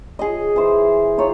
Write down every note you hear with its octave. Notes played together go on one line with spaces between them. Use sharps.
G#4 D#5
E3 C5
D#4 F4 C#5